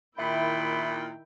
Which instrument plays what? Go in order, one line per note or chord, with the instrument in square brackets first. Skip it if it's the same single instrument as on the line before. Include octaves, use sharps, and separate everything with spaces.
[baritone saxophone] A#2 [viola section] D#3 E4 G5 [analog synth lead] E5 [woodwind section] B5